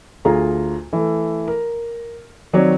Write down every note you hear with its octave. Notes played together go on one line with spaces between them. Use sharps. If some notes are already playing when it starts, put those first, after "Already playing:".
D2 F4 G#4 A#5
E3 A3
A#4
D#3 F#3 C4 C#5 D5